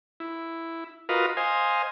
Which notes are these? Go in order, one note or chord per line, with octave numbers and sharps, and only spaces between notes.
E4
F4 F#4 A#4 B4 D#5 F5
C5 D#5 F5 G#5